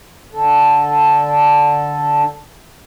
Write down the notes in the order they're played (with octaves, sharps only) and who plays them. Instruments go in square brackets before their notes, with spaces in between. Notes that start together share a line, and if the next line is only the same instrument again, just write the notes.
[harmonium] D3 A4